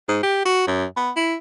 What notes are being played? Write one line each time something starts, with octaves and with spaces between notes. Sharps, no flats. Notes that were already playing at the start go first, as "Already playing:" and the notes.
G#2
G4
F#4
F#2
B3
E4